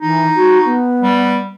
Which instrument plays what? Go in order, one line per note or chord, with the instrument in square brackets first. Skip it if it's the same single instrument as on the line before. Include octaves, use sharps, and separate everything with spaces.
[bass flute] E3 [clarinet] D#4
[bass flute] F#4
B3
[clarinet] G3